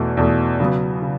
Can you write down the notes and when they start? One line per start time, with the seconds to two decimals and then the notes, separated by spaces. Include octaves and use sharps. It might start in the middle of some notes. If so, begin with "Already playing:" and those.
Already playing: E2 B2 A3
0.17 E2 B2 A3
0.60 C#3 F#3 B3
1.02 C#3